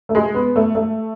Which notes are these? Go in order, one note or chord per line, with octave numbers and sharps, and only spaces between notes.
A3
G#3
B3
A3
A3